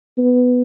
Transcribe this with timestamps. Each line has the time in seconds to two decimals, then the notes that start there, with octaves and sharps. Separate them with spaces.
0.18 B3